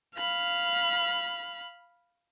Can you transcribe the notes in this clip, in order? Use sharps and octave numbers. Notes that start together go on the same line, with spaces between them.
F5 B5